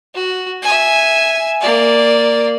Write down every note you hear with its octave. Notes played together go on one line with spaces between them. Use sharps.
F#4
E5 G#5
A#3 D5